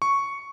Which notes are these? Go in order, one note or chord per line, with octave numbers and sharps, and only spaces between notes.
C#6